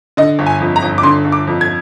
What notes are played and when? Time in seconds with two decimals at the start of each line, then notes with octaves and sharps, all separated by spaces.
0.17 D3 D#5
0.39 G1
0.46 G#5
0.60 F2
0.76 A#5
0.83 G1
0.98 D6
1.03 D3 C6
1.25 G1
1.32 D6
1.47 F2
1.61 G#6